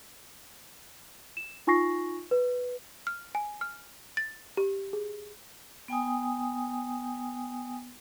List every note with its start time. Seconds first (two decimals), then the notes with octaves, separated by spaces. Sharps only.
1.37 E7
1.67 D#4 F4 G#5 C#6 A#6 C7
2.31 B4
3.07 F6
3.35 G#5
3.61 F6
4.17 A6
4.57 G4
4.93 G#4
5.88 B3 G5 G#5 D#6